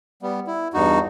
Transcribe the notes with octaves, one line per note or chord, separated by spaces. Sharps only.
G3 B3
E4
E2 G2 D#4 F#4